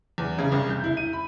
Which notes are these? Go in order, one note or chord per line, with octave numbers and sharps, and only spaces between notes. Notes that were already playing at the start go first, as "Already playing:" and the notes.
E2
C#3
C2
G6
E4
D#7
B5